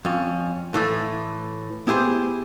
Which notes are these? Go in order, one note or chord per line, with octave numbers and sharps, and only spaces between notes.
F2 C#4
A2 E3 A3
B3 E4 G4 G#4 C5